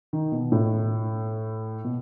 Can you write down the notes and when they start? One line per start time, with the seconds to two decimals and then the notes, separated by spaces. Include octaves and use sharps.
0.13 D#3
0.32 B2
0.52 A2
1.84 B2